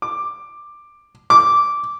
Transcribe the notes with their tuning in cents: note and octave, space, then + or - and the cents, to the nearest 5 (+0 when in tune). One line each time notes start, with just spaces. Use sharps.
D6 +10
D6 -10